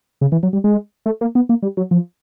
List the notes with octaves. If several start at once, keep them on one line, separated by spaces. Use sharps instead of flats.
C#3
E3
F#3
G3
G#3
A3
A#3
B3
A#3
G3
F#3
F3